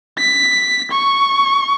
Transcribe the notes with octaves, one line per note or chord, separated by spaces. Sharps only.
B6
C#6